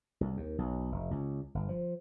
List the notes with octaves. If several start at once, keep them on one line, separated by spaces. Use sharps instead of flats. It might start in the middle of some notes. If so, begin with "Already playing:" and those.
C2
D#2
B1
F1
C#2
G1
F3